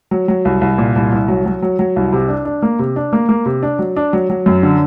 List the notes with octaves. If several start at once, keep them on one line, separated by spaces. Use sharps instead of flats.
F#3
F#3
C2
C2
A#2
C2
C2
F#3
F#3
F#3
F#3
C2
C3
D4
D4
A#3
C3
D4
A#3
A#3
C3
D4
F#3
D4
F#3
F#3
F#2
D3